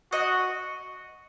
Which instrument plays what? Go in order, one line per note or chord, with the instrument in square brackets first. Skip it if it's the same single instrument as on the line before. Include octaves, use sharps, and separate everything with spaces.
[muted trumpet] F#4 [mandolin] D#5